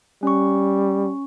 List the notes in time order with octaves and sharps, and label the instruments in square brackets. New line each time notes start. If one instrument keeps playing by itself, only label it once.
[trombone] G3 [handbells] C#4 C#6